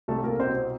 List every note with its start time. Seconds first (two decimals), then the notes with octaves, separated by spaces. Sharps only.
0.08 C2 A3 A4
0.24 A#3 A#4
0.39 B2 C4 C5